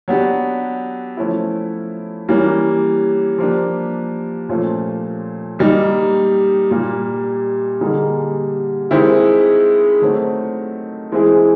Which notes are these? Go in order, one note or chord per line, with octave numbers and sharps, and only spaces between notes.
F#3 B3 D4 G4
F3 A3 C#4 E4
E3 G3 A#3 C#4
F3 A#3 D4 G4
A#2 F3 A3 C#4 F4
D#3 G3 A#3 D#4
A#2 G3 A#3
D3 G3 A#3 D#4 G#4
D#3 G#3 C4 E4 G4
D#3 F#3 A3 C4
E3 G#3 C4 E4 G#4